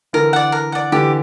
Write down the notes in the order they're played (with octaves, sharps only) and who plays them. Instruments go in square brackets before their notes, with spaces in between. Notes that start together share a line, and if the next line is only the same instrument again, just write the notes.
[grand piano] D3 E3 [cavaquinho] A#4
[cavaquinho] D5 F#5
A#4
D5 F#5
[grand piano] D3 E3 [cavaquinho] G4